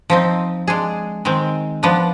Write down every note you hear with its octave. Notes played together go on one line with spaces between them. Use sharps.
F3 C4 D#4
G#3 D4 G#4
D#3 G#3 C4
F3 B3 D4